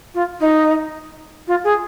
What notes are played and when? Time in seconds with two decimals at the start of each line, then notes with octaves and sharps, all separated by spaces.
0.14 F4
0.40 D#4
1.47 F4
1.64 G#4